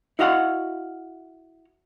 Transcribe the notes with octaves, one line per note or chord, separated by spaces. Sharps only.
E4 F#4 D#5 F5 F#5